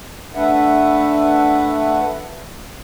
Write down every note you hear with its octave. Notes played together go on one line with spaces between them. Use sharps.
A3 D4 B4 E5 F#5